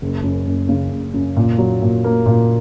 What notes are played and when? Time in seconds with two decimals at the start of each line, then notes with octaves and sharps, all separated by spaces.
0.02 F#1
0.24 F#2
0.47 F#1
0.69 C#3
0.91 F#1
1.14 F#2
1.37 A#2
1.58 F#3
1.82 A#2
2.04 A#3
2.26 A#2